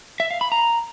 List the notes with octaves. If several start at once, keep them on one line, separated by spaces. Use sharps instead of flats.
E5
F5
B5
A#5